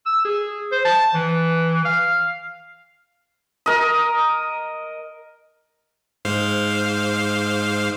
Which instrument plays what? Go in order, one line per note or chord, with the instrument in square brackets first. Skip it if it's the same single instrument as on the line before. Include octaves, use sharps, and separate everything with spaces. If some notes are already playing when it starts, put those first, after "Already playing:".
[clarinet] E6
G#4
C5
A5
E3
F5
[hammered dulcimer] A#4 D#5
[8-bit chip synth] G#2 C5 F5